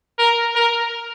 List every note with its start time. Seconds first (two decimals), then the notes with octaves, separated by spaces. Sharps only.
0.19 A#4
0.55 A#4